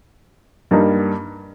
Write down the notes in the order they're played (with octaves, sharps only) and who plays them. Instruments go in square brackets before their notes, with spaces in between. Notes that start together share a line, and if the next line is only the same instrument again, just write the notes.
[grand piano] G2 G3 A#3 D#4